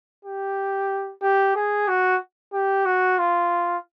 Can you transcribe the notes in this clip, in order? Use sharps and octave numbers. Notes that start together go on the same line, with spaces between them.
G4
G4
G#4
F#4
G4
F#4
F4